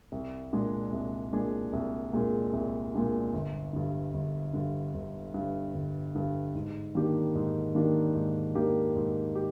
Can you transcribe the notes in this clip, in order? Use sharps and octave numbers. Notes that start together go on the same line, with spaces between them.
C2
A#2 G#3 D4 G#4
C2
A#2 G#3 D4 G#4
C2
A#2 G#3 D4 G#4
C2
A#2 G#3 D4 G#4
G1
G2 D3
G1
G2 D3
G1
G2 D3
G1
G2 D3
G#2
D#3 A#3 D4 G4
G#2
D#3 A#3 D4 G4
G#2
D#3 A#3 D4 G4
G#2
G4